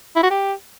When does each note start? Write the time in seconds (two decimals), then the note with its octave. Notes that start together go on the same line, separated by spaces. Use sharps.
0.16 E4
0.23 F#4
0.30 G4